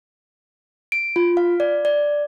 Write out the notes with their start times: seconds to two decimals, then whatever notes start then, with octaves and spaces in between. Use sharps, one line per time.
0.92 D7
1.16 F4
1.37 F5
1.60 D5
1.85 D5